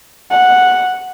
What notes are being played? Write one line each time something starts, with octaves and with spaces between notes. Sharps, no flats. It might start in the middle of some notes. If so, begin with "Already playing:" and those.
F#5